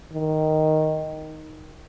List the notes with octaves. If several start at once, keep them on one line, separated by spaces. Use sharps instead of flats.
D#3